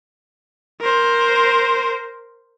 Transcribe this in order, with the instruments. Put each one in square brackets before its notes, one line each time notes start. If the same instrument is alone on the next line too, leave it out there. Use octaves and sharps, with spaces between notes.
[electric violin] A#4 C5